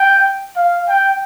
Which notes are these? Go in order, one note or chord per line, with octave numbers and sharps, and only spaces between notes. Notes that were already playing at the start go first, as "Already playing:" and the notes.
Already playing: G5
F5
G5